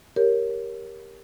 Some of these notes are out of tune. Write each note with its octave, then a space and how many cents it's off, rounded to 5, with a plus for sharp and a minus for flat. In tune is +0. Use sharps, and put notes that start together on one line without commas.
G4 +5 A#4 +0 C#5 +0